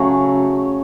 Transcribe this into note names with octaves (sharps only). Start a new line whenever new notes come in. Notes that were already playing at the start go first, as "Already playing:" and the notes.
Already playing: C#3 F#3 A3 C#5